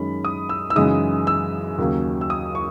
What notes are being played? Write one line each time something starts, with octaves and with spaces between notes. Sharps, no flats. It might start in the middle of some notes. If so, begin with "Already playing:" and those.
Already playing: F#2 D#3 G#3 C#4 B5
D#6
E6
E6
F#2 C#3 E3 G#3 D#4 D#6
E6
D#2 C#3 F#3 A#3
E6
D#6
C#6